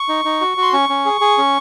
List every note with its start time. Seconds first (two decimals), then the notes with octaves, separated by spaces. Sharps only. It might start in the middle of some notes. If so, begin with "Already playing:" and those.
Already playing: C#6
0.09 D#4
0.25 D#4
0.41 F#4
0.57 F#4 C6
0.73 C#4 C#6
0.89 C#4
1.05 G#4
1.21 G#4
1.38 C#4